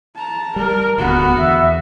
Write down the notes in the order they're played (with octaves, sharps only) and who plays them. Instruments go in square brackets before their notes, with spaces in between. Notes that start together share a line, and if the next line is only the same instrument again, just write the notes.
[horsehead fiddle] A5 A#5
[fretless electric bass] G3 [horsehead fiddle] A#4
[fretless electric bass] D#1 D2 D3 [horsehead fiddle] B3 F#4
[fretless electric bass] E2 [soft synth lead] E5